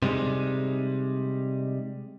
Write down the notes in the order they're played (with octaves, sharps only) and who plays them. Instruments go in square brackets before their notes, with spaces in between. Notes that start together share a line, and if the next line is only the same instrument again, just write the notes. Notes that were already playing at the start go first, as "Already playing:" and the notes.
[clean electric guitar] C3 G3 G#3 D#4